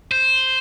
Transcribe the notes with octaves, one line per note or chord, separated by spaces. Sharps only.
C5